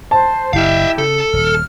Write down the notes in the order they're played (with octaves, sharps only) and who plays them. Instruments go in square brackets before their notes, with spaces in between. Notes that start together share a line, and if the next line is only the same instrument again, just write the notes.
[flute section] C5 [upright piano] A5
[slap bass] F#1 [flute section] E4 G4 [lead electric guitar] E5 F5
[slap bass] C#3 [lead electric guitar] A4
[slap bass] D#1 [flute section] F6